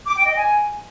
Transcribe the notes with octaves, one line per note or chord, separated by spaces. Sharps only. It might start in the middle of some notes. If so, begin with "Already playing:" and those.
D6
G5
D#5
G#5